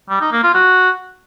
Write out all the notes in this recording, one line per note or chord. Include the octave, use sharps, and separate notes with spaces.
G3
D#4
A#3
F4
F#4